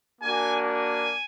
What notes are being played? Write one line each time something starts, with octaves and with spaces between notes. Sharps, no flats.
A#3 D4 F#4 G#5
G#5